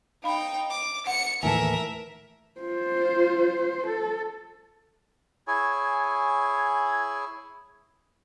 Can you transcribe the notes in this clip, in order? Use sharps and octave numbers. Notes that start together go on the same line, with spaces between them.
D#4 F5 G5 B5
D6
F#5 C#7
D#2 A2 E3 A#4 E5 G#5 A5
F4 C5
A4
E4 G#4 C#5 G#5